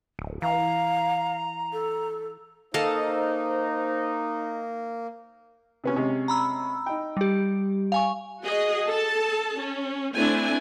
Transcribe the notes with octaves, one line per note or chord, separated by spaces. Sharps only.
D1
E3 F5 A#5
A4
A#3 D#4 A4 C5 D#5 F5
C3 B3 C#4
C3 G#3 C#4
A#5 B5 E6
D#4 G5
G3 G4
F5 G#5 C#6
F#4 G#4 D#5
A4 A5
C#4
A3 C4 D4 E4 G#5